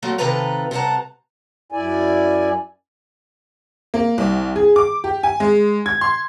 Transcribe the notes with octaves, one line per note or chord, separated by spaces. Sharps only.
F#3 G3 A3 A#3 C4
C3 D#3 F4 A4 B4 A#5
C3 G3 F#5 A5 A#5
F#2 E4 D5 G#5
A#3
C2
G#4
D6
G4
G#5
G#3
G#6
C6